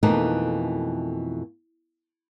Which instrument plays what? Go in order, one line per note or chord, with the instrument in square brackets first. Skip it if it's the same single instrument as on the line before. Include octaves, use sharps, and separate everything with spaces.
[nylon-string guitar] F2 B2 E3 A3 A#3 D#4